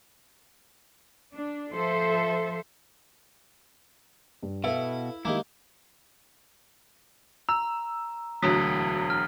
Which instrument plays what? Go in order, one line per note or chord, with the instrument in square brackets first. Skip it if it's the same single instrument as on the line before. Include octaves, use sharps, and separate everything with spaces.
[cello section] D4
F3 A4 C5 E5
[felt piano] G2
[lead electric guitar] B2 [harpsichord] E4 [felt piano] A4 B4 F5
[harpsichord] D#3 A#3 [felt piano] G#3 G4 [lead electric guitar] E4
[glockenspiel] A#5 [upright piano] E6
[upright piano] E1 D2 F#3 [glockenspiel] D#6 B6
[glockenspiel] F6